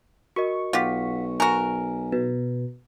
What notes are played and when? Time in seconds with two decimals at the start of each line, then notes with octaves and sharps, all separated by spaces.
0.36 F#4 A#4 D#5 C#6
0.73 B1 F4 G4 F5 F#5 B6
1.40 F#4 A#4 G#5
2.12 B2 B4